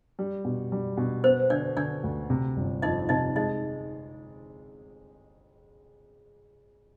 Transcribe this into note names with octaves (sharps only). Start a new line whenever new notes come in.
G3
B2
G3
B2
B3 C5
D3 D4 D5
D3 D4 D5
D2
C3
G1
F2 D#4 D#5
C3 D#4 D#5
G#3 D#4 D#5